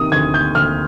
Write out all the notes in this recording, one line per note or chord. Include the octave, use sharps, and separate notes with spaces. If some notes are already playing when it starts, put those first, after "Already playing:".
Already playing: C3 D#3 D#6
D2 G#6
G6
D2 F6